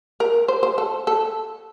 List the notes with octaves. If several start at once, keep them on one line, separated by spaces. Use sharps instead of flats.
A#4
C5
C5
A4
A4